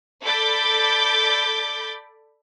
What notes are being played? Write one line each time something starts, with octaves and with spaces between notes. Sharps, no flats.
A4 D5 B5 D6 G6 A6